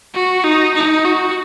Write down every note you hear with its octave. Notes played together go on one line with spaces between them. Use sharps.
F#4
D#4
D#4
F#4